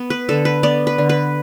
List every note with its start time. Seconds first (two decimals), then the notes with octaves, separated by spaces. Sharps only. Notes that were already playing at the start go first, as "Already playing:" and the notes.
Already playing: B3
0.10 B4
0.29 D3 A4
0.45 B4
0.63 B3 D5
0.87 B4
0.98 D3
1.09 B4